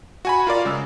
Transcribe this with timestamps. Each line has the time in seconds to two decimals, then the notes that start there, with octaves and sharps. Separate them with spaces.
0.25 F#4 G#5 B5
0.47 F4 A#4 D5 F5
0.65 C#3 G#3 E6